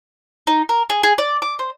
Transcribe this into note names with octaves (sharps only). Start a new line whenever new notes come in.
D#4
A#4
G#4
G#4
D5
D6
C5